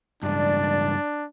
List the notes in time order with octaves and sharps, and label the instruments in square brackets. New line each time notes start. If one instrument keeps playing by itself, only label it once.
[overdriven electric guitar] C#2 G2 [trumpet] D4 [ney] D5